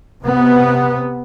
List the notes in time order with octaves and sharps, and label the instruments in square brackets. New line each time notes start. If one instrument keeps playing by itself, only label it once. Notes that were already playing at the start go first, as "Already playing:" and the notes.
[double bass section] C3 B3